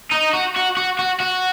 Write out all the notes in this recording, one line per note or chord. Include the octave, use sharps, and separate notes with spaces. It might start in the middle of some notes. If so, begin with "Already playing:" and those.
D#4
F#4
F#4
F#4
F#4
F#4